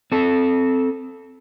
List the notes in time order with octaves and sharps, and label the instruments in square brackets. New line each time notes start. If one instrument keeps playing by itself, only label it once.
[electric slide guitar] C4 A4